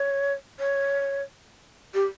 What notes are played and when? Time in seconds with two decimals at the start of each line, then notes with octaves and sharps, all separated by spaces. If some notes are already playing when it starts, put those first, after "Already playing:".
Already playing: C#5
0.60 C#5
1.94 G4